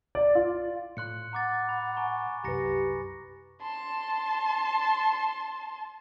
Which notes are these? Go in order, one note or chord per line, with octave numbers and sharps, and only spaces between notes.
D5
F4
A2 C6 F#6 C#7
F#5 A#5 D6 A6
B5
G#5 A#5 C#6
C2 F#2 G4 B4 A#5 A#6 C#7
A5 C6